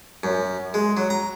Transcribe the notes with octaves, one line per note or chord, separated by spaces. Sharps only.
F#2
G#3
F#3
A#5